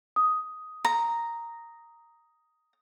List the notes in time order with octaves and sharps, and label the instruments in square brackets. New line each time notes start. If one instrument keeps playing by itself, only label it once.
[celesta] D#6
[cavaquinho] A#5